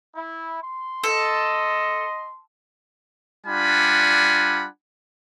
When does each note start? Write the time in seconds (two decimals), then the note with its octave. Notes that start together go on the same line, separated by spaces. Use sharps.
0.16 E4
0.63 C6
1.04 A4 D#5
3.47 G3 D4 F4 F#5 G#5 B5